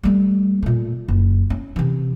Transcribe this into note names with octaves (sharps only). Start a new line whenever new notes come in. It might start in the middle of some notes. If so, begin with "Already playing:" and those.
G3 A3
A#2 A3
F#1
C#4
C3 E3